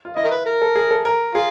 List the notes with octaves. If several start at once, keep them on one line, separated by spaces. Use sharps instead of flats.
F4
E4 D#5
A#4
B4
A#4
A4
G#4
A4
A#4
F4 G#4